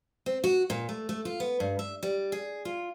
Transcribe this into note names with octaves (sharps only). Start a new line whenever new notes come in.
C4
F#4
A#2
A3
A3
F4
B3
G2
E5
G3
G#4
F4